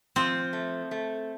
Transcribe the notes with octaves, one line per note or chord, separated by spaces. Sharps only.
F3 C4
A3
A3